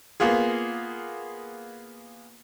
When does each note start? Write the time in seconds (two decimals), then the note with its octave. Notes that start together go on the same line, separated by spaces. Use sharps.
0.20 A#3 B3 F4 G#4